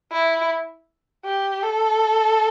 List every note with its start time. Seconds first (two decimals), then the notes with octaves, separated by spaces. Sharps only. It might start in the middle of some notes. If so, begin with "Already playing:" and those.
0.12 E4
1.25 G4
1.62 A4